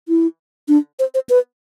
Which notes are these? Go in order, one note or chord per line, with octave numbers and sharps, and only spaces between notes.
E4
D4
C5
C5
B4